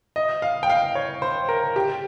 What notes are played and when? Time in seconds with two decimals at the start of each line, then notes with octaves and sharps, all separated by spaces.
0.16 D#5
0.42 F5
0.63 G5
0.70 F5
0.95 C#5
1.22 C5
1.49 A#4
1.76 G4